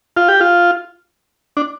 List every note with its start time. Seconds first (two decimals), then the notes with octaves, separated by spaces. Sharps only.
0.17 F4
0.28 G4
0.41 F4
1.57 D4